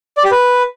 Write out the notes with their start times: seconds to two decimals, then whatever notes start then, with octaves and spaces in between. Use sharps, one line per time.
0.17 D5
0.24 G4
0.31 B4